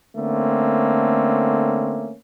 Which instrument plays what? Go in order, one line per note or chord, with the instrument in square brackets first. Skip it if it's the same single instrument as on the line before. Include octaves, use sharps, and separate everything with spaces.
[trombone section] D3 A3 A#3 C4 C#4